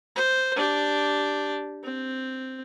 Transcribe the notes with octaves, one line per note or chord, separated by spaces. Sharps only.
C5
D4 G4
C4